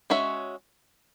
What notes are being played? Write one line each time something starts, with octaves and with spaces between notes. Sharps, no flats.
G#3 C#4 F#4 C#5 E5